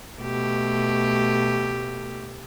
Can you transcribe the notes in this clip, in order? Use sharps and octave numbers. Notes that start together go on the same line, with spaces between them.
B2 A3 G4